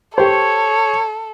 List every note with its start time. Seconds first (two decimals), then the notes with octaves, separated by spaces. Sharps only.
0.18 G4 A4 C5 C#5